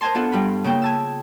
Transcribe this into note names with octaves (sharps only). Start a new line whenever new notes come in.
A#4 C5 D#5 G#5 A5 C6
B3 D4 F4 A4 F#5
G2 G3 F4 B5
C#3 A#3 G5
G#5 A5 E6